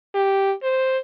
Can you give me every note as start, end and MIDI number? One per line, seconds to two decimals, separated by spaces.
0.15 0.52 67
0.63 0.98 72